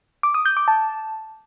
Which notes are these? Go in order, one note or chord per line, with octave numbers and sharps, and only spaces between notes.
D6
D#6
G6
D6
A5